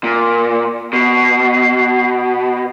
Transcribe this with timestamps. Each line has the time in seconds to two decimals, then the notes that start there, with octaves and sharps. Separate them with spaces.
0.04 A#2
0.93 B2 C7